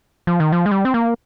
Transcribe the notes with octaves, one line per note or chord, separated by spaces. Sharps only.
F3
D#3
F3
G#3
G3
C4
A#3